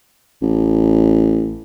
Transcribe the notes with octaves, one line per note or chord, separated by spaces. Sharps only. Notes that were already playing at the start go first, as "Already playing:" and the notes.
A1